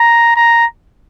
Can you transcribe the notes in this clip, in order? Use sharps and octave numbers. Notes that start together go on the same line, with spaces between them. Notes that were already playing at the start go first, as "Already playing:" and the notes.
Already playing: A#5
A#5